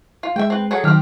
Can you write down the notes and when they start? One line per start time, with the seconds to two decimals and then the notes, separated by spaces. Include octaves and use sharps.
0.23 F4
0.36 G#3 E5 G5
0.50 C4 B4
0.71 F#3 G#4 A4
0.84 D#3 F#3 C4 G4 F6